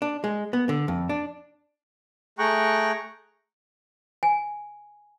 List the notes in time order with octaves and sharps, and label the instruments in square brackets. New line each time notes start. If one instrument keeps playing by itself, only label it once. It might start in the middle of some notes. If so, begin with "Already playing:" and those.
[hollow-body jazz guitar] D4
G#3
B3
D3
F2
D4
[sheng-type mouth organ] A3 G#4 G5 A#5 C#6 F#6
[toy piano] G#5